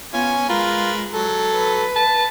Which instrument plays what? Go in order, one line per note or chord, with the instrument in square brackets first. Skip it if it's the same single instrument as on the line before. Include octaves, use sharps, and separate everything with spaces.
[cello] B3 [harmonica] C#4 G#5 [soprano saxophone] F4
[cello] G#3 [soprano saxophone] F4 [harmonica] A#4 B4
[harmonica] F#3 [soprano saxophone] A4
[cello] B4
[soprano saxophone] A5